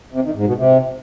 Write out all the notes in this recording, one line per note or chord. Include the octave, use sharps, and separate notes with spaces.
C3
D#3
G#2
B2
C3